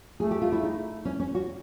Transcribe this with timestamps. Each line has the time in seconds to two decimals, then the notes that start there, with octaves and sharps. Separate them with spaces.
0.20 A3 G#4
0.31 G4
0.42 F4
0.52 E4
0.63 D#4
1.05 C#4
1.20 C#4
1.35 F#4